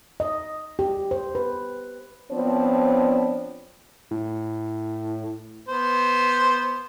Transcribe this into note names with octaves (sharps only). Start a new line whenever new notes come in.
D#5
G4
C5
B4
F3 B3 C4 D4 C5 C#5
A2
B3 C5